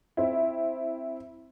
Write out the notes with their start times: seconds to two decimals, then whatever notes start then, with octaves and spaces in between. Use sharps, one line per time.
0.17 C4 E4